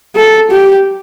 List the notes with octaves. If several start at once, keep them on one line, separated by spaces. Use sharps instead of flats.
A4
G4